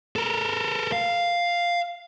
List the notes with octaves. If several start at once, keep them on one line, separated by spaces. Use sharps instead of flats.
A4 A#4
F5